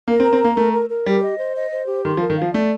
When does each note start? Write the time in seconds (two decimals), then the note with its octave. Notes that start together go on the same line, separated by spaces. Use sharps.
0.08 A#3 A#4
0.20 C4
0.23 A#5
0.33 C4
0.41 A#3 A#5
0.57 A3 A#4
0.73 A#4
0.90 A#4
1.06 G3 G4
1.23 D#5
1.39 C5
1.56 D#5
1.72 C5
1.88 G4
2.05 D#3 C6
2.17 F3
2.21 A#4
2.30 D#3
2.37 F3 F5
2.54 A3 D5